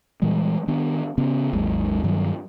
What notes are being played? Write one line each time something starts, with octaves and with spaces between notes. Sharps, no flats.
A#2 E3 G3 G#3
D#3 B3 D4
C#3 B3 C#4
G#1 D#2 F#3 G#3
G2 D#3 F#3 G3